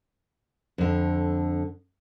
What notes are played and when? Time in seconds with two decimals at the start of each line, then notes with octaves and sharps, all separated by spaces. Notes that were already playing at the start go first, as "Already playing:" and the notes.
0.78 F2 D3